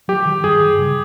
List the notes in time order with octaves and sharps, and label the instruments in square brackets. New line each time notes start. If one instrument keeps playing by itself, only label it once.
[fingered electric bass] F#3 [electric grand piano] G4
[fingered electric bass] D#3
[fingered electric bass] G2 [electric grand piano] G#4
[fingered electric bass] G2
C#3